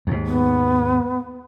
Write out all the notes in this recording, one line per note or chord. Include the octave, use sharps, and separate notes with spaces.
D#2 G#2
B3